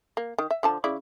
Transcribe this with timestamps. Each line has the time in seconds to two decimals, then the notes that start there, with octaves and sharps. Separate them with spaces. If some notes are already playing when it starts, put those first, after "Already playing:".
0.17 A#3
0.38 D#3
0.51 E5
0.63 D3 F3 A5
0.84 C#3 E4 D5